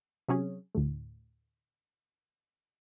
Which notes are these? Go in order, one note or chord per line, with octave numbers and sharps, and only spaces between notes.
C3 F#3 C#4 G#4
D2 A2